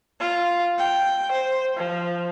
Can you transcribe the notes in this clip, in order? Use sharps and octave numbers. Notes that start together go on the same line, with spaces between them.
F4
G5
C5
F3